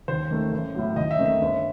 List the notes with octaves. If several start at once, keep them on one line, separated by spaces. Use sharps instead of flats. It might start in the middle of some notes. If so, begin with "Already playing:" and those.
D#2 C5
D#3 A3
A1
A2 F#3
D#2 D#5
E5
D#3 A3 C4
E5
G1